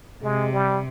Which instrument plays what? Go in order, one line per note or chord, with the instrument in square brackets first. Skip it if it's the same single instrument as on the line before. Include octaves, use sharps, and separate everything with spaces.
[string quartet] C3 [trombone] G#3
[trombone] G3